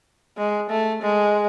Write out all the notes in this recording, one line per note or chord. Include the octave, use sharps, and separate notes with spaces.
G#3
A3
G#3